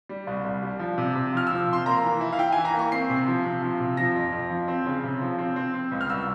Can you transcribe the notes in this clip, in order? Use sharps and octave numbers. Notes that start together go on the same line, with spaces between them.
G3
C2
C2
G3
F3
C3
C3
F3 F6
F3 E6
C3 C6
A#3 A#5
E3
E4
F5
E4 G5
E3 G#5
A#5
A#3 C#6
C4 C7
C3
F3
C3
F3
C3
F3 A#6
F2
F2
F3
C4
C#3
C3
F3
C4
C4
C4
C#2
F6
C2 E6